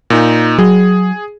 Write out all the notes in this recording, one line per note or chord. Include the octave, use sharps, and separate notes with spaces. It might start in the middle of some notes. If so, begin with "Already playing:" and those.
A#2 D#4
F#3 G#4